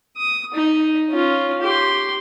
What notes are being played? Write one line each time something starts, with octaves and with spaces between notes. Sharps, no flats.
D#6
D#4
C#4 F4
G4 C6